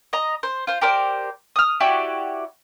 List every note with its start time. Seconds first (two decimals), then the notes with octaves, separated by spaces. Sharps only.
0.13 D#5 A#5
0.43 C5
0.67 F4 C5
0.81 G4 A#4 C5 D5
1.56 D#6 F6
1.80 E4 F#4 G4 D5